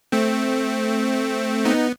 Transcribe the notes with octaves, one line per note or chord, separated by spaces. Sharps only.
A3 C4
B3 D#4